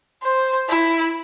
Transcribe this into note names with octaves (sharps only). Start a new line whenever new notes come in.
C5
E4